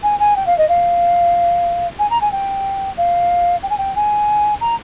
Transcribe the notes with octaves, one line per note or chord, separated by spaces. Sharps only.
G#5
G#5
G5
F5
D#5
F5
G#5
A#5
G#5
G5
F5
G5
G#5
G5
G#5
A#5